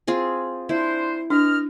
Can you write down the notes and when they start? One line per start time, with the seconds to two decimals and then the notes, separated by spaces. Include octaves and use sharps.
0.07 C4 F4 G#4
0.69 D4 E4 C5
1.30 E3 D4 D#5 F6